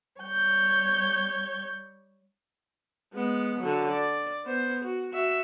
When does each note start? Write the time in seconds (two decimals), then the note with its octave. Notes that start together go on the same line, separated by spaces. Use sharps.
0.20 G3 C#5 G6
3.14 G#3 B3
3.60 D3 F#3
3.91 D5
4.46 B3 C5
4.84 F#4
5.13 F#4 E5